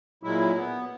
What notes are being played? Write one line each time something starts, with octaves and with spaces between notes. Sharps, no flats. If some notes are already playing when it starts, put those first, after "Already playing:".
A#2 F#3 G#3 E4
B3